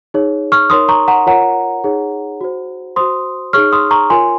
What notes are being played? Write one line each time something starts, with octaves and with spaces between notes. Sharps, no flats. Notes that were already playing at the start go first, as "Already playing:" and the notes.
D#4 G#4 C#5
C#6 F6
D#4 A#4 C#5 C6 D#6
A#5 C#6
F#5 A#5
F4 A#4 C#5 F#5 A#5
D#4 G#4 C#5
F#4 C5
F#4 C5 C6 D#6
D#4 G#4 C#5 C#6 F6
C6 D#6
A#5 C#6
F4 A#4 C#5 G#5 C6